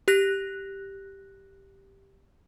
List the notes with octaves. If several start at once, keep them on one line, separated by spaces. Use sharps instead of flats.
G4 F#6 A#6